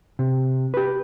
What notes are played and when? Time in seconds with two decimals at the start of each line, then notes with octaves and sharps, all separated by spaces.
0.19 C3
0.74 G4 B4